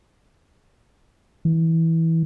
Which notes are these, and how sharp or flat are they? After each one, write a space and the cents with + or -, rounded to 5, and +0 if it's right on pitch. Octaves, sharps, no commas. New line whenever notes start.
E3 -15